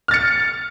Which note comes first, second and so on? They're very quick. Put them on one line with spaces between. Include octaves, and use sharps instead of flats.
F6 A6 C#7